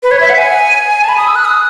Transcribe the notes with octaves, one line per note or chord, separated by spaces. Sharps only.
B4
C#5
E5
F#5
G#5
A5
B5
D#6
E6
F#6
D#6